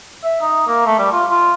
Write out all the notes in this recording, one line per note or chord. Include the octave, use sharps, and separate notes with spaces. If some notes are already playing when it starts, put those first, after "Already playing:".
E5
D#4
A#3
A3
G3
F4
F4